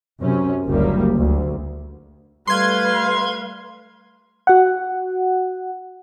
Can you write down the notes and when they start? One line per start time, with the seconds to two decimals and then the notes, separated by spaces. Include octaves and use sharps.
0.21 F#2 C3 C#4
0.67 F#1 D2 G3 A#3
1.15 D2
2.47 G3 A3 B4 F5 C6 G#6
4.47 F#4 F#5